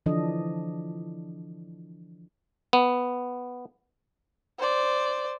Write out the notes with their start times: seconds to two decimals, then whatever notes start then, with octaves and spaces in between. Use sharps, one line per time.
0.06 D3 E3 F3 D4 A4 D#5
2.73 B3
4.58 C5 D5